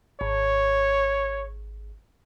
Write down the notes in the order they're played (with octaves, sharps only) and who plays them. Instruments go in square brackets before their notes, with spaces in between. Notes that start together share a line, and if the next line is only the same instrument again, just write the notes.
[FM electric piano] G#1 [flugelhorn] C#5